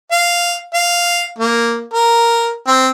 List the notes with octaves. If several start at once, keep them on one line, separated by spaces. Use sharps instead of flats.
F5
F5
A#3
A#4
C4